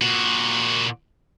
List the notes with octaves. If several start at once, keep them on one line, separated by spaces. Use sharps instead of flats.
A#2 F#4